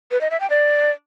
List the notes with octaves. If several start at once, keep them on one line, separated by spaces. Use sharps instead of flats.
B4
D#5
E5
G5
D5